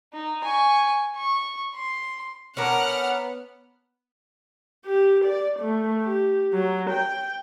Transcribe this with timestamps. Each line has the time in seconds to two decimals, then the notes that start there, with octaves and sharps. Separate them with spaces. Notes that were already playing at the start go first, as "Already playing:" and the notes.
0.14 D#4
0.44 G#5 C#6
1.16 C#6
1.75 C6
2.57 B3 C#4 D4 A#4 F#5 F6
4.86 G4
5.25 D5
5.60 A3
6.03 G4
6.54 F#3
6.91 G5